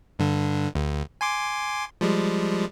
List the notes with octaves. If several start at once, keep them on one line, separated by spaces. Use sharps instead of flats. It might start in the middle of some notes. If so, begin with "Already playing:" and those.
G2 D3
D2
G#5 C6 D6
F3 G3 G#3